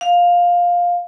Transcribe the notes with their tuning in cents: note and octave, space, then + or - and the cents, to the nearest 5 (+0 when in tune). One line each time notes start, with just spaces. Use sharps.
F5 +10